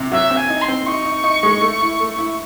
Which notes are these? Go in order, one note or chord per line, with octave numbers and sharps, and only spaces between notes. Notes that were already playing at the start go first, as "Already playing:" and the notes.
Already playing: C3
F#3 E5
C4
G#5
D#4
C6
C4
D#4 C#6
D#4
D#4
G#3
A3
E4
A3
E4